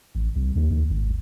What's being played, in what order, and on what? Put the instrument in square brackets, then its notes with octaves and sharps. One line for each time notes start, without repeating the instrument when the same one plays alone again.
[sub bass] A1
C2
D#2
D#2
G#1